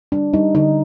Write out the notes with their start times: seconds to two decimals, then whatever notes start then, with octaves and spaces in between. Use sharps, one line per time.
0.12 G3 D4
0.33 G3 D#4
0.55 D3 D#4